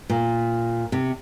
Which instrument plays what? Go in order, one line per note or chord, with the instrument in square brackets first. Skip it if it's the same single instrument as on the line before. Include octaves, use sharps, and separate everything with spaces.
[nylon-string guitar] A#2
C3